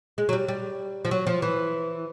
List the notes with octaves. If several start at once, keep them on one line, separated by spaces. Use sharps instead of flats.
G#3
F#3
G3
G3
F3
F#3
F3
E3